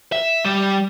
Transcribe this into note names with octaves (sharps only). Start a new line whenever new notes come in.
E5
G3